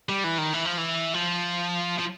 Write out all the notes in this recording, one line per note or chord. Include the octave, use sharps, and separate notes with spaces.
G3
E3
D#3
E3
F3
E3
F3
F3